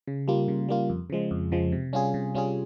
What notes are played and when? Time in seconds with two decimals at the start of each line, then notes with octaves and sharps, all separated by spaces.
0.07 C#3
0.28 G3 A#3 F4
0.48 C#3
0.69 G3 A#3 F4
0.90 F2
1.10 C#3 F3 G#3
1.31 F2
1.52 C#3 F3 G#3
1.72 C3
1.93 G3 C#4 F4 G#4
2.14 C3
2.35 G3 C#4 F4 G#4